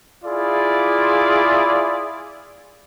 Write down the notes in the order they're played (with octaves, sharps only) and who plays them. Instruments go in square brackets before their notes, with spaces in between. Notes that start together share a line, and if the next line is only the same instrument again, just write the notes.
[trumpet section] E4 F4 G#4 D5